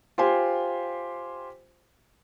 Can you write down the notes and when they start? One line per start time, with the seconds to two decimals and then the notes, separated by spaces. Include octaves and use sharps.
0.18 F4 G4 C5 G#5